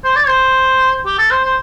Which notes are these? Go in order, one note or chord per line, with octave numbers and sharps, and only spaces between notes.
C5
D5
C5
G4
A4
C5
C5